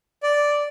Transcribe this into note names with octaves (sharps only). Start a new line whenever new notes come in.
D5